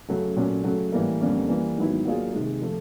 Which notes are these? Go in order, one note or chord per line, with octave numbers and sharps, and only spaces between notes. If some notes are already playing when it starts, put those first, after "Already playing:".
F#2 C#3 F#3 A3
A#2 F#3 A3 C#4
C#3 F#3 A3 C#4
A2 E3 G3 A#3
F2 D3 G3 A#3 C#4
E3 G3 A#3
G#2 D#3 F#3 B3 E4
F#3 A#3 D4 F4 G#4
C3 D#3 G#3
F3 A3